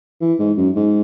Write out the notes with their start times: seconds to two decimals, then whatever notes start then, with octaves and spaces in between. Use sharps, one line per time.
0.21 E3
0.39 G#2
0.57 F#2
0.76 G#2